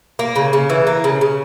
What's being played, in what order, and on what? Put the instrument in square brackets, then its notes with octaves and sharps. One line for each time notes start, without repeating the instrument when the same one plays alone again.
[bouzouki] A#3
C#3
C#3
E3
A#3
C#3
C#3